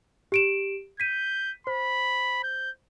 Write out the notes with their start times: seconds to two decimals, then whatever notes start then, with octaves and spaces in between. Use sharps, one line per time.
0.32 G4 D7 E7
1.00 G6 B6 D#7
1.67 C5 B5
2.44 G6